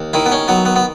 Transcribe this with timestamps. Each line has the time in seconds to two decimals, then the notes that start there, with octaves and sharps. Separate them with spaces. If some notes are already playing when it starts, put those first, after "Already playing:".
Already playing: D#2
0.13 D#3 E4
0.26 B3
0.32 C#4
0.48 F#3 B3
0.65 B3
0.76 B3